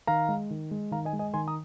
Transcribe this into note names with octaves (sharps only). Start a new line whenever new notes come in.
D#3 F5 A#5
G#3
D#3
G#3
D#3 F5 A#5
D#5 G#5
G#3
D#5 G#5
D#3 G#5 C6
A#5 D#6